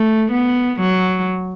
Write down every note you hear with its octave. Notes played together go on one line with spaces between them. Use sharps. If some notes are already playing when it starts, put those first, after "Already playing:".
Already playing: A3
B3
F#3